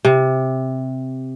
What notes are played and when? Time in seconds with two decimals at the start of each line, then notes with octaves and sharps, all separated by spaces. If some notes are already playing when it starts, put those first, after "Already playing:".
0.05 C3